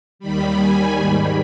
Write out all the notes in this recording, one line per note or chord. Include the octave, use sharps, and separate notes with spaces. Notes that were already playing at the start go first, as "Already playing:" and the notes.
D#2 D#3 G3 B5
G#5
G#2 D#3 G3 B5